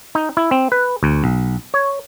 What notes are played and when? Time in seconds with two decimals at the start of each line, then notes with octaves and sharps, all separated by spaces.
0.15 D#4
0.37 E4
0.51 C4
0.72 B4
1.03 D2
1.24 B1
1.74 C#5